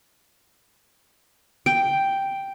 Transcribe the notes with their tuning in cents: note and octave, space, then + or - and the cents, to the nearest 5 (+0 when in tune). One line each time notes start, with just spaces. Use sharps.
G5 +0